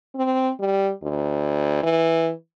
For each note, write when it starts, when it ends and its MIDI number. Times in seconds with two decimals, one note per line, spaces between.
0.15 0.50 60
0.59 0.90 55
1.03 1.81 38
1.83 2.31 52